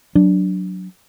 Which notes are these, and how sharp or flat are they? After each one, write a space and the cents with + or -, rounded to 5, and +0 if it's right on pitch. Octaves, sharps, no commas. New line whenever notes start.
F#3 +0 D4 +0